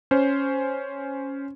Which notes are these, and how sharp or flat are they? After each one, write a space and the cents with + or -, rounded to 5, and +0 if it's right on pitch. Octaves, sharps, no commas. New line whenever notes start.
C#4 +0 C5 +0